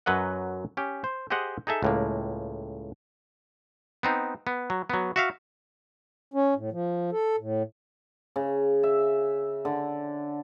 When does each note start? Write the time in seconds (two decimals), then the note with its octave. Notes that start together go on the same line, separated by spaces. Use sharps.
0.06 F#2 F#3 B4 D#5 F#5
0.77 C#4 G4
1.04 C5
1.30 G4 G#4 C5 D#5 F#5
1.67 D#4 G#4 A4 E5
1.83 C#2 A2 A#3
4.03 B3 C4 D#4
4.47 B3
4.70 F#3
4.90 F#3 B3
5.16 F#4 E5 F5
6.34 C#4
6.55 A2
6.72 F3
7.12 A4
7.38 A2
8.36 C#3
8.83 E5
9.65 D3